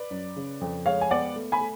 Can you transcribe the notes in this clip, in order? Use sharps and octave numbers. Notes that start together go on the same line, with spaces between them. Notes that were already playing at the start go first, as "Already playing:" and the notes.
Already playing: B4 D5
F#2
C#3
F2
G#3 C#5 F5
G#5
B3 D5 F#5
A3
G#5 B5
A3